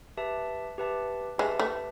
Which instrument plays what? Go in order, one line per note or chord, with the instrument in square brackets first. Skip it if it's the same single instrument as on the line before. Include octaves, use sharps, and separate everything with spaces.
[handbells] G4 B4 E5 A5
G4 B4 E5 A5
[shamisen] G#3 [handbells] G4 B4 E5 A5
[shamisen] A3